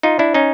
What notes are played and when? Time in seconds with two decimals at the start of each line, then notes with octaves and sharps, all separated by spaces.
0.03 D#4 F4
0.19 D4 E4
0.34 C#4 D#4